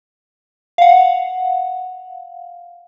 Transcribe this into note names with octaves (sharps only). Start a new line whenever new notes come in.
F5 F#5